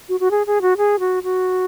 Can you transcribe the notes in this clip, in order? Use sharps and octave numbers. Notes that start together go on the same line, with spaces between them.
F#4
F#4
G#4
G#4
F#4
G#4
F#4
F#4